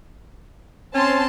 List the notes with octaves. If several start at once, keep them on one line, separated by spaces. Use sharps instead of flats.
C4 C#4 A5 C6